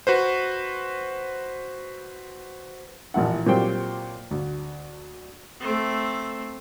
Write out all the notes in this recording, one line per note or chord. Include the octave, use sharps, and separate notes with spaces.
F#4 B4 C5
A1 A#2 F3 E4 F#5
A#2 F#3 C4 G4 C5 G5
D2
A3 C4